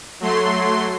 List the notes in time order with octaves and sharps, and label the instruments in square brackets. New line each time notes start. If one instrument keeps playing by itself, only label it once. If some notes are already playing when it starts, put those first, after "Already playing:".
[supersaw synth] F#3 A3 C6